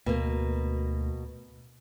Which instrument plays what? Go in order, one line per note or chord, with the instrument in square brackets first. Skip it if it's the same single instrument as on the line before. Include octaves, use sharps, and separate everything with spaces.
[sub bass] D2 [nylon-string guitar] B2 A#3